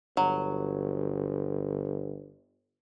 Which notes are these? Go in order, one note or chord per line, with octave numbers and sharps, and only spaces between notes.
G1 F#3